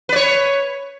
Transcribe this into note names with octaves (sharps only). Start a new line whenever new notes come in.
B4 C#5 D5